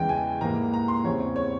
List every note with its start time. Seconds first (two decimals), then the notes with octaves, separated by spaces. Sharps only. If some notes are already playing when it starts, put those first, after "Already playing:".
Already playing: E2 C#3 E3 G#3 G5
0.09 G#5
0.41 G#2 E3 G3 A#3 A#5
0.73 A#5
0.88 C6
1.04 E2 C#3 G3 C4 C#5
1.36 C#5